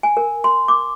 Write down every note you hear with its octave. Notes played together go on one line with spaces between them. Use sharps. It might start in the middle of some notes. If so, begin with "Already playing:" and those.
G#5
A#4
C6
D6